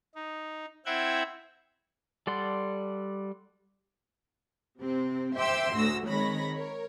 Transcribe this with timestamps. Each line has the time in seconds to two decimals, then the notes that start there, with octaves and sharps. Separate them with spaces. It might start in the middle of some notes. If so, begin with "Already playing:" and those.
0.15 D#4
0.86 C4 E4 E5 F#5 G5 G#6
2.27 G3 A4 D5 F#5 C6
4.81 C3 C4
5.36 C5 E5 G5 C6 D6 E6
5.74 D2 A2 F#4 E6 A#6
6.08 D#3 G#3 C4 C#5 B5 A#6
6.52 A#4 C#5